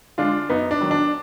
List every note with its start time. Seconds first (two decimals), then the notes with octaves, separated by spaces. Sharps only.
0.18 D3 G#3 D4 F4
0.49 F#2 B3 D#4
0.71 D4
0.81 D#3 F#3
0.91 D4